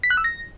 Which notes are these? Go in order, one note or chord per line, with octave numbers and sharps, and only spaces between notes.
B6
F#6
E6
A#6